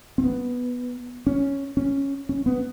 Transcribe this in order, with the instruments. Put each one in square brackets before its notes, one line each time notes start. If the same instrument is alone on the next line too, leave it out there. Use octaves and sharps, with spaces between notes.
[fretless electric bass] C4
B3
C#4
C#4
C#4
B3